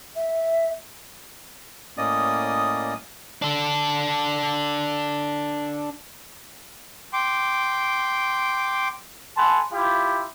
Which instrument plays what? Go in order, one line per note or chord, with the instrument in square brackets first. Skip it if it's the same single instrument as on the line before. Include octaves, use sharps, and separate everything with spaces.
[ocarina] E5
[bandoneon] A2 A#3 C#4 D5 D#5 D#6
[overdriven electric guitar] D4 A4
[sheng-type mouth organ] G5 C6 D6
[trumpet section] A4 F#5 G#5 A5 B5 C6
E4 F4 G4